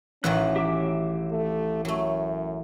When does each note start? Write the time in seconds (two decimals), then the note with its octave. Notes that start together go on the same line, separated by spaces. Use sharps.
0.24 A1 D#3 F#3 C#4 E4 B4 F#6
0.56 G4 E5 D6
1.31 A3
1.85 F#2 F#3 A3